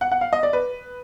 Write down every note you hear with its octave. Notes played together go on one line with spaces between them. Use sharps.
F#5
F#5
F5
D#5
D5
B4